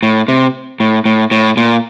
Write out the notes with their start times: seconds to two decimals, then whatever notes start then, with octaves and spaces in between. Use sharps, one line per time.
0.03 A2
0.28 C3
0.80 A2
1.05 A2
1.31 A2
1.57 A#2